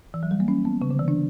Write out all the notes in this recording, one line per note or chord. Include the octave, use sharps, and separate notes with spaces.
E3
F#3
G3
A#3
C#4
B3
C#3
D3
E3
D4